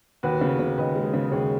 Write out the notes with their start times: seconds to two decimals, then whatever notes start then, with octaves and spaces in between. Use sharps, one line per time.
0.23 D#2 F#4 B4
0.41 C#3
0.60 C#3
0.78 D#2 B4 D#5
0.96 G#3
1.14 C#3
1.32 D#2 G#4 C#5